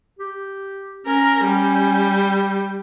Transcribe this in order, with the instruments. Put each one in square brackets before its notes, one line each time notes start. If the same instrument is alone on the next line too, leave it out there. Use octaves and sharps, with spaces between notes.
[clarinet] G4
[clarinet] C#4 [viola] A#4
[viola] G3